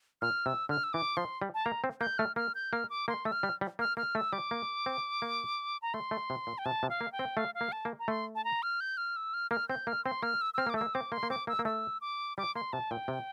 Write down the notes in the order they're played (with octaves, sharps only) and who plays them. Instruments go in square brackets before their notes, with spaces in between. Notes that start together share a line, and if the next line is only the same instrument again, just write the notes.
[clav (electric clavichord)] A#2 [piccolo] F6
[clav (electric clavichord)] C3 [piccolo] E6
[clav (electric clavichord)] D3 [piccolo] F6
[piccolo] E6
[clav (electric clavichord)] E3 [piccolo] D6
[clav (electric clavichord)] F3 [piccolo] C6
[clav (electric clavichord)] G3
[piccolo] A5
[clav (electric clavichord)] A#3 [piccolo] A#5
[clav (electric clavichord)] C4
[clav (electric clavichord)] A#3 [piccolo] G6
[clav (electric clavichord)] A3 [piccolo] F6
[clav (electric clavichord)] A#3 [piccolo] F6
[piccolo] G6
[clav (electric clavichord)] A#3 [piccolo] F6
[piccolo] D6
[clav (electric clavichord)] A#3 [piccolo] C6
[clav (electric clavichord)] A3 [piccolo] E6
[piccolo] F6
[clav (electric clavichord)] G3
G3
[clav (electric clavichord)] A#3 [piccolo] F6
[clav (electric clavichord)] A#3 [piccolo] F6
[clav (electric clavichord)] A3 [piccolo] E6
[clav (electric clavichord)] G3 [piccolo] D6
[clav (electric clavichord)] A#3
C4
A#3
[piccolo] A#5
[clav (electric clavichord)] A3 [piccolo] C6
[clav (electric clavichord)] A3
C3
A#2
[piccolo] G5
[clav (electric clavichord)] C3 [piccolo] A5
[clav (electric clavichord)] C3
[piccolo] F5
[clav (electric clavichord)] A#3
[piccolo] G5
[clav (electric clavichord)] C4
[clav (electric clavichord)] A3 [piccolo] F5
[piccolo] F5
[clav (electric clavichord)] A#3
[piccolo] A5
[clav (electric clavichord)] A#3
[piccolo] A#5
[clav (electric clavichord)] A3 [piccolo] C6
[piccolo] A5
A#5
F6
G6
F6
E6
F6
[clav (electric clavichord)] A#3 [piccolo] F6
[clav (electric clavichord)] C4 [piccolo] G6
[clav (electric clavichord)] A#3 [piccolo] F6
[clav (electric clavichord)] C4 [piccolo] C6
[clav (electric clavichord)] A#3 [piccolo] F6
[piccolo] E6
E6
[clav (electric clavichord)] C4 [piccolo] F6
[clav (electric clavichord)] A#3
[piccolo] D6
[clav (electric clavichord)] A3
[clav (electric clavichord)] A#3 [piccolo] E6
[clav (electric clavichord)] C4 [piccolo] D6
[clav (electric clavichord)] A#3 [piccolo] C6
[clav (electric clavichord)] A#3
[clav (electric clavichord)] C4 [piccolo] D6
[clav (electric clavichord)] A#3 [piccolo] E6
[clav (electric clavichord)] A#3
[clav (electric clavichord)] A3 [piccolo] E6
[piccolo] D6
[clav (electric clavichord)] G3 [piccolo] D6
[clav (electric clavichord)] A#3 [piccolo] C6
[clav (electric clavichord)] C3 [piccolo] A5
[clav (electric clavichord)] A#2 [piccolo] G5
[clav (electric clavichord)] C3